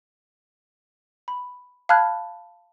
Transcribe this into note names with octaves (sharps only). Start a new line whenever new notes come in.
B5
F5 A5 B5 F6 F#6 G#6